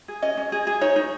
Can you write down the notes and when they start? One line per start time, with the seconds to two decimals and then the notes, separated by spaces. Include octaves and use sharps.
0.08 G#4
0.22 C#4 D#5
0.37 C#4
0.52 G#4
0.67 G#4
0.81 D#4 C#5
0.96 D#4